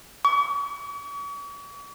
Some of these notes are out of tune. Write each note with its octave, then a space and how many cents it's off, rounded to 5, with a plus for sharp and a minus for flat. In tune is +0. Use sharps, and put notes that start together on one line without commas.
C#6 +45